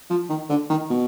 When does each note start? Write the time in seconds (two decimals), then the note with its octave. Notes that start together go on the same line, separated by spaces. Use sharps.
0.10 F3
0.29 D#3
0.49 D3
0.70 D#3
0.90 B2